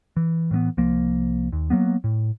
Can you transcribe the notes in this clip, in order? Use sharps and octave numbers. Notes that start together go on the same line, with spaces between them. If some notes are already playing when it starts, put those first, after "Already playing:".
E3
A2 E3 A#3 B3
C2 F3 A#3
D#2
F#3 G3 A#3 B3
A2